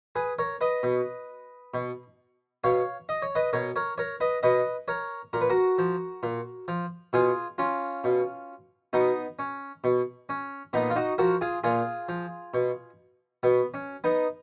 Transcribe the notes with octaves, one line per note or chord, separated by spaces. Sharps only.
G#4 B4
A#4 C#5
B4 D#5
B2
B2
B2 C#5 F5
D#5
C#5
B4 D#5
B2 A#4 C#5
A#4 C#5
A#4 C#5
B4 D#5
B2 B4 D#5
A#4 C#5
A#2 A#4
B4
F#4 A#4
F3
A#2
F3
B2 F4 G#4
C#4 F4
B2
B2 B3 D#4
C#4
B2
C#4
A#2 B3 D#4
F4
D#4 F#4
F3 F#4 A#4
F4 G#4
A#2 F4 G#4
F3
B2
B2 B3
C#4
B3 D#4